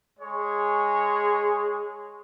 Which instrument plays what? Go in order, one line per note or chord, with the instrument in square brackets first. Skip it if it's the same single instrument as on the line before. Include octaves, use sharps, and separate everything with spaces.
[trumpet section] G#3 G#4 C#5